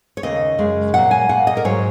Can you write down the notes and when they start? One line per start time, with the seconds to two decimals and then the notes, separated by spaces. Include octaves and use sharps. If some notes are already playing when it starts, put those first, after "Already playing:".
0.17 C#5
0.23 D#2 C#3 A#3 D#5
0.59 F#2 C#3 G#3
0.93 A#2 F#3 A#3 F#5
1.11 G#5
1.29 A#2 A#3 F#5
1.47 D#5
1.57 A#4
1.64 G#2 F#3 A#3 C#5